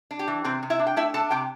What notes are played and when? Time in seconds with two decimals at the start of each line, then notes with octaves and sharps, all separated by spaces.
0.11 D4
0.19 G4
0.27 E3
0.44 C3 C4 C5
0.63 C3
0.70 E4 E5
0.79 D4
0.87 G5
0.96 A3 E4 E5
1.14 D4 A4 A5
1.31 C3 G4 G5